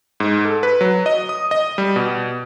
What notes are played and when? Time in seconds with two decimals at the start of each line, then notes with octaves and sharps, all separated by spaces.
0.20 G#2
0.45 A4
0.63 B4
0.81 F#3
1.06 D#5
1.29 D#6
1.51 D#5
1.78 G3
1.96 B2